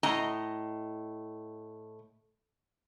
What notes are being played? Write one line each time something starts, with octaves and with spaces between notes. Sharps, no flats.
A2 D#5 A#5